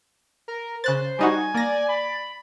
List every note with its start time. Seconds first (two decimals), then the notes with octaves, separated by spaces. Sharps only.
0.48 A#4
0.84 C#3 C5 F#6 A6
1.19 G3 D#4 F#4 G#5
1.54 A#3 D5 A#6
1.88 B5